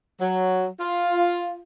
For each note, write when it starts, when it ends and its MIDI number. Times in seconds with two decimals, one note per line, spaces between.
0.20 0.67 54
0.79 1.60 65